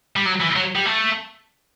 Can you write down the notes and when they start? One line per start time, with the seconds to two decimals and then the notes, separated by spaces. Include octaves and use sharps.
0.16 G3
0.26 F#3
0.41 E3
0.56 F#3
0.75 G3
0.85 A3